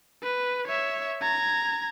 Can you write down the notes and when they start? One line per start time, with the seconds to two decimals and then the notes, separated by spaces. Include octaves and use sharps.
0.23 B4
0.68 C#5 E5
1.22 A#5 G#6